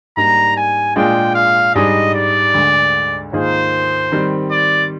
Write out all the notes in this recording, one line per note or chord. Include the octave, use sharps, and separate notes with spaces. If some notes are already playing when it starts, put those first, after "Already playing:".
G#2 G3 A#3 D4 A#5
G#5
A#2 G#3 D4 F4 G#4 G5
F5
G#2 G3 D4 G#4 D#5
D5
D2 D3 G#3
G#2 D#3 A#3 F4 G#4 C5
D#3 G3 C4
D5